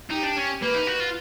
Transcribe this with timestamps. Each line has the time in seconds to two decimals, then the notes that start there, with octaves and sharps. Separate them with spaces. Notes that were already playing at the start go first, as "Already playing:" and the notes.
0.11 D#4 G4
0.24 D4
0.36 C#4
0.62 A#3 B4
0.74 D#4
0.87 F#4
1.00 F4